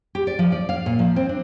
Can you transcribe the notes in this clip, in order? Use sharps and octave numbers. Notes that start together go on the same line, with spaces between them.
G4
D5
F3
D5
F5
A#2
F3
C4
D4